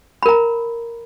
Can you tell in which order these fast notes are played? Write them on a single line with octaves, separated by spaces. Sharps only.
B5 A#4 A#5